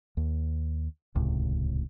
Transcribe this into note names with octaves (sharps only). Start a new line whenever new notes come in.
D#2
D#1 C#2 A2 C3